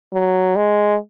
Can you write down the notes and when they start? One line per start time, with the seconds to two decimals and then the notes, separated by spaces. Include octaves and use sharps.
0.13 F#3
0.56 G#3